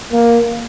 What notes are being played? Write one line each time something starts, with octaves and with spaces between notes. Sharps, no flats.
A#3